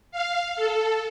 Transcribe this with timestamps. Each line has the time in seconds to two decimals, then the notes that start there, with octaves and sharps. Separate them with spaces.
0.11 F5
0.56 A4